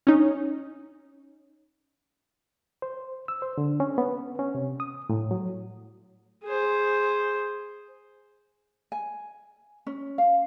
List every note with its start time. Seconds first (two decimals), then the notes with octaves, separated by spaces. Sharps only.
0.07 C#4 D#4
2.82 C5
3.28 E6
3.42 C5
3.58 D3
3.80 C#4
3.98 B3
4.39 C#4
4.55 C3
4.80 D#6
5.10 A2
5.31 F#3
6.44 G#4 C5
8.92 G#5
9.87 C#4
10.18 F5